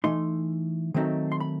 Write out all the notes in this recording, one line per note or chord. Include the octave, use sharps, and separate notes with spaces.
E3 A3 D#4 C6
D#3 F#3 A3 C4 D#4
C6
B5